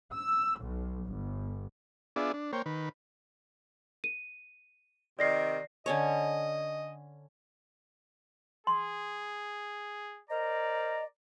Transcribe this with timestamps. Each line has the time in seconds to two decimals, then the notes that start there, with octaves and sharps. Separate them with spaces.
0.14 E6
0.61 B1
1.07 G1
2.16 B3 D4 F4 G#4 D5 E5
2.34 D4
2.53 A#3 C5 C#5 G5
2.66 D#3 B4
4.04 D#7
5.19 C3 D#3 D5 A#6 C7
5.86 D3 C#4 C#5 D#5
8.67 G#4 C6
10.30 A#4 C5 D5 D#5 A#5